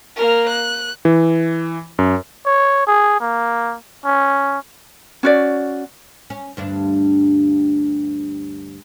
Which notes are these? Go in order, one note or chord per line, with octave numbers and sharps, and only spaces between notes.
A#3 A#4
F#6
E3
F#2
C#5
G#4
A#3
C#4
C#4 F#4 D5
C#4
D2 G2 D4